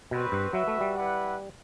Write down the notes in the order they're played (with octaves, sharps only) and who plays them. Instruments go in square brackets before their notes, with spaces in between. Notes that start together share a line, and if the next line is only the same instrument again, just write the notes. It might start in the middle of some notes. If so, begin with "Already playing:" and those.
[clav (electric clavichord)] B2 [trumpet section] G3 C4 F#4 B4
[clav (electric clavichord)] G2
[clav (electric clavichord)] F#3 [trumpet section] F#4 B4 E5
[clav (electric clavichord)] A3
G3
[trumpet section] E4 B4 D5 F#5